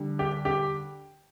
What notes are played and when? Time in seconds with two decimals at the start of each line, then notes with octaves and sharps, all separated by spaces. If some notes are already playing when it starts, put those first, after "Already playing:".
Already playing: D3 G3
0.19 G4
0.45 G4